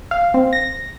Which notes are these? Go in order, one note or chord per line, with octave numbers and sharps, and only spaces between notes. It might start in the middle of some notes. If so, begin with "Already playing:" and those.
F5
C4
A#6